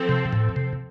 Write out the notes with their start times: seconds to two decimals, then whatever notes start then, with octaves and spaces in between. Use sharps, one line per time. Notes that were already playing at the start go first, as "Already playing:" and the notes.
Already playing: F3 C4 A4
0.09 C3
0.33 A2
0.56 C3